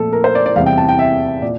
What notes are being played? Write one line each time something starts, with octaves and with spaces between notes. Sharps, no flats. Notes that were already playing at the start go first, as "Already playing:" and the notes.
Already playing: A#2 F3 A3 A4
A#4
C5
D5
D5
E2 C3 G3 F5
G5
A5
G5
E5
A#2 D5